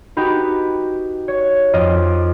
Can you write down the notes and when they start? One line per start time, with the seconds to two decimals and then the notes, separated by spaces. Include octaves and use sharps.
0.17 D#4 F#4 G4 B4
1.28 C#5
1.73 F2 F4 D#5 D6 F6